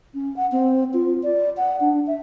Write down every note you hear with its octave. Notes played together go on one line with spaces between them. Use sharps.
C#4
F#5
C4
F4
D5
F#5
D4
E5